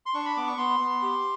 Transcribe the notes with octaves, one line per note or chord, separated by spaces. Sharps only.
C6
D4 C#6
B5
B3 D6
C#6
B3 C6
B3
G4